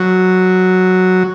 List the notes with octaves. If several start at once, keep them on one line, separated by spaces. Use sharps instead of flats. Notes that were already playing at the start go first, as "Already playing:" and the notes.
Already playing: F#3